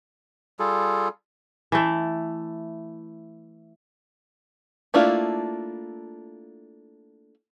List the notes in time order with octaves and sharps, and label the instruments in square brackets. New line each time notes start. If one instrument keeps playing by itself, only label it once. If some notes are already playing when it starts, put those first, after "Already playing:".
[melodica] G3 F4 G#4 A4
[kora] E3 A3
[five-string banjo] A3 A#3 D4 E4 F4